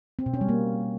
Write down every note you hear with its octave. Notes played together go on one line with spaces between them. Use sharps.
C4
B2
C#4
G3
A#3